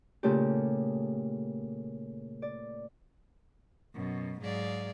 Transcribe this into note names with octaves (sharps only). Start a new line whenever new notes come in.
A#2 C#3 A3 C#4 F4 G4
D5
F#2 B2
G#2 F#3 G#4 D5 F5